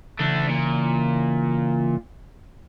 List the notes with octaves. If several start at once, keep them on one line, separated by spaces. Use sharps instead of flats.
C#3 E3 A3 D4
A#2